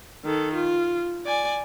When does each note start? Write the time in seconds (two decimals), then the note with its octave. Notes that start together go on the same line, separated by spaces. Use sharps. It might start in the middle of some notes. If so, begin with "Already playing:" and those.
0.25 D#3 A4
0.54 F4
1.26 D5 G#5